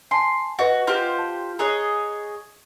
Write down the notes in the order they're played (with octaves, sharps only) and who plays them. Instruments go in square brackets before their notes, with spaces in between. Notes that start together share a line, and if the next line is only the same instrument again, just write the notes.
[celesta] G#5 A5 [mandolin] C6
[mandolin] F#4 [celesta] B4 D#5 F#5
[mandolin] F4 G4 C5
[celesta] A5
[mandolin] G#4 C#5 D#5 [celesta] A#5 F#6